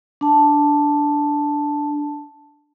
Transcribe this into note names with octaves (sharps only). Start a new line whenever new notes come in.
D4 A5